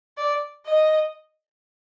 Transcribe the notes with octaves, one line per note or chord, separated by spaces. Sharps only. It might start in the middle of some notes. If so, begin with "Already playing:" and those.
D5
D#5